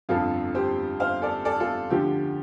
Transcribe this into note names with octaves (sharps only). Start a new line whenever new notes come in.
G1 F2 F3 F4 A4
G4 C5
C5 F5
A4 D5
A4 D5
F4 A4
D2 D3 F3 G4